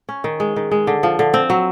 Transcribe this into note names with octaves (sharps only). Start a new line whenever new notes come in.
C#4
D#3
G#3
D#3
G#3
D3
F3
D3
C4
F#3